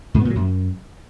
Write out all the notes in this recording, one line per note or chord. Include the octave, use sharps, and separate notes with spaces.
G#2
B3
A#2
F#3
F#2